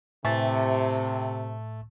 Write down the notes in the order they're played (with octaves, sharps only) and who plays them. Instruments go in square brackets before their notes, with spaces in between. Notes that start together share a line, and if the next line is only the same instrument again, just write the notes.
[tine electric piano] A2 A6 [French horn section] C3 [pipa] E3 A3